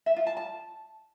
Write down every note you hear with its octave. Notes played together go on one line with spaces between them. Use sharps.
E5
F4
A5
A5